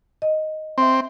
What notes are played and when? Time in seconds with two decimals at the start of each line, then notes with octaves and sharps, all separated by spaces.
0.22 D#5
0.78 C4 E5 C6